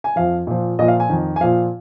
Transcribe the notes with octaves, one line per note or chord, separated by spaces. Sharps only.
G#5
F2 F3 F5
A#2 F3
A#2 F3 D#5
F5
G#5
F2 D#3
G#5
A#2 F3 F5